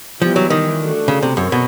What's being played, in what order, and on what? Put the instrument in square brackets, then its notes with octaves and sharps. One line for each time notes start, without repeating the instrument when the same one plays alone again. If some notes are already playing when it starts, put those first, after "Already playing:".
[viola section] E3 G3 B3 E4 G4 [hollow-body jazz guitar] F3
[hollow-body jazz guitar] F#3
D#3
[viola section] A3 D4 F#4 A4
[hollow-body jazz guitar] C#3
C3
[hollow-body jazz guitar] F#2 [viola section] C4 A#4 C#5
[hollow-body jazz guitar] B2